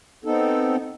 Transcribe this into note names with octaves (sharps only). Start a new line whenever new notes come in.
B3 C4 D#4 A4